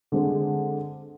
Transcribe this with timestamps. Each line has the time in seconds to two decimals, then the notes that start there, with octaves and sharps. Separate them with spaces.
0.12 D3 G#3 C4